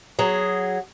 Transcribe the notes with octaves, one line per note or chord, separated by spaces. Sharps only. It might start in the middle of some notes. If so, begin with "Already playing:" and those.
F#3 G#4